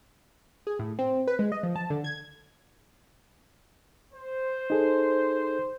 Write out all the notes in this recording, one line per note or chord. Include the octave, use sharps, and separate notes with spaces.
G#4
A2
C4
B4
G#3
D#5
F3
A5
D3
G#6
C5
D#4 G#4 A4